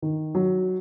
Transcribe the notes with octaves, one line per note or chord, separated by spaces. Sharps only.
D#3
F#3